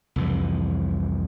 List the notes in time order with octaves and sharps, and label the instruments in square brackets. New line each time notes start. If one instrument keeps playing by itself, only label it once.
[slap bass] C2 F2 E3